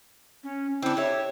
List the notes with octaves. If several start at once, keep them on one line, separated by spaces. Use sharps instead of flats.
C#4
C4 D4 E4
G4 C#5 E5